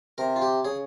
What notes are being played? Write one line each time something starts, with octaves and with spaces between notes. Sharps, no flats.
C3 A#4
F4
G4
C#3 G#4